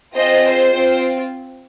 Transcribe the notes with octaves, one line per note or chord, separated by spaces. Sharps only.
C4 F4 G#4 C5 D#5
C5
C4 F4